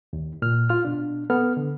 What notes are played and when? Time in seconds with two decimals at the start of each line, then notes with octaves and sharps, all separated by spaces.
0.13 D#2
0.42 A#2 F6
0.70 F4 F6
0.85 B2 D4
1.30 B3 A4 F6
1.57 D3